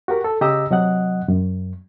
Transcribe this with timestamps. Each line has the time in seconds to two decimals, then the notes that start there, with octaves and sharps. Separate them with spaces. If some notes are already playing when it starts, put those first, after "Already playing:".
0.08 F#4 G4 A#4
0.24 A4
0.41 C#3 G4 D#5 A#5 E6
0.71 C3 F#3 D#5 F#5 F#6
1.28 F#2